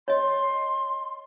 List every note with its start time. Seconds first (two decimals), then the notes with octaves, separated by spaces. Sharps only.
0.08 C#5 D#5 C6